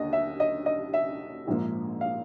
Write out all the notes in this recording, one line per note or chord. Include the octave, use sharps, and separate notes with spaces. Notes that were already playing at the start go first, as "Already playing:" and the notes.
Already playing: D#2 D3 A#3 D#5
E5
D#5
D#5
E5
A#1 G#2 F3 A#3
F5